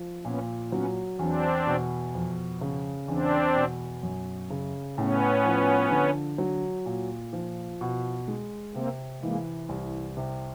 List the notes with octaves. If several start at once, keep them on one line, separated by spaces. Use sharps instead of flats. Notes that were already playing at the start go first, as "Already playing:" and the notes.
Already playing: F3
A#2 B3 C#4
F#3 B3 C#4
E2 C4 D4
B2
F2
C#3
E2 C4 D4
B2
F#2
C#3
A2 B3 C#4
F3
D3
F#3
A#2
F3
B2
G#3
C3 A#3 C4
E3 G#3 A#3
C2
C3